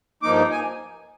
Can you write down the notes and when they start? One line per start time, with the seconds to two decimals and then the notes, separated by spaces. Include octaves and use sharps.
0.23 G2 F3 A#3 D#4 D6
0.51 G#5